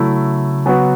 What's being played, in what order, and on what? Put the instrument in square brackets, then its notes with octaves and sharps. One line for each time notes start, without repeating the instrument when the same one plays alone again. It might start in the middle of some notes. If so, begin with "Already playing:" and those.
Already playing: [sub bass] C#3 [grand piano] F#3 A3 E4
[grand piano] F#3 B3 F#4